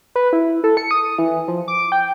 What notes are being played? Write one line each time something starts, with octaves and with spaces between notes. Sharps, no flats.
B4
E4
A4
C#7
D#6
E3
F3
D6
G5